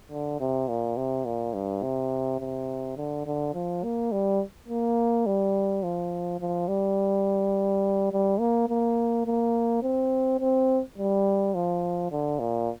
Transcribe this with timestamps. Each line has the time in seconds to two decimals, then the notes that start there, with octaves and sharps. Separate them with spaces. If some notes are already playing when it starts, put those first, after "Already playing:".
0.11 D3
0.40 C3
0.69 A#2
0.97 C3
1.25 A#2
1.54 G2
1.83 C3
2.40 C3
2.97 D3
3.26 D3
3.54 F3
3.84 A#3
4.12 G3
4.69 A#3
5.26 G3
5.83 F3
6.41 F3
6.68 G3
8.12 G3
8.40 A#3
8.69 A#3
9.26 A#3
9.83 C4
10.40 C4
10.98 G3
11.55 F3
12.12 D3
12.40 A#2